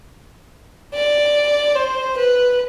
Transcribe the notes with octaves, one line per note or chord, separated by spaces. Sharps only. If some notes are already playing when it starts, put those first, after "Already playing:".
D5
C5
B4